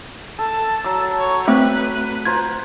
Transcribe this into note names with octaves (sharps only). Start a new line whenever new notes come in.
A4 A5
F#3 E6
C#5
A3 C4 B4
F4 C5 A#5 G#6